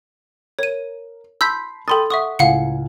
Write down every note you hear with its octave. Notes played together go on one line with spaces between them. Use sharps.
A#4 C#5 D#7
A5 B5 C6 E6 G6 B6
A4 G5 B5 C6 D#6 A6
E5 F#5 C#6 D#6
C#2 A2 F5 F#5 G#5 C#7